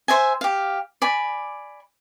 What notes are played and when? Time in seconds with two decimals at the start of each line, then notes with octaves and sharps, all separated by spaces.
0.08 C5 E5 G#5
0.41 G4 F5
1.02 D5 G#5 B5